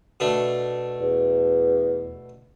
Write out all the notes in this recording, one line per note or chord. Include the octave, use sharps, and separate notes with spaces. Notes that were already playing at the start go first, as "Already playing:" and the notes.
B2 A3 D4
E2